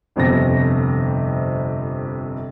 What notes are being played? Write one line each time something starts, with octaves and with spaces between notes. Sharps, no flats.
G1 F2 C3 A#6